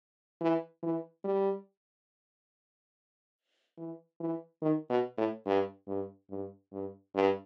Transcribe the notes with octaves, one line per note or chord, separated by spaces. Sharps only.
E3
E3
G3
E3
E3
D#3
B2
A2
G2
G2
G2
G2
G2